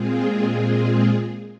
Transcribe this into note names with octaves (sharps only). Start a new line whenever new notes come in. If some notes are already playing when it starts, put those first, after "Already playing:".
Already playing: A#2 G#3 C4 F4 G#4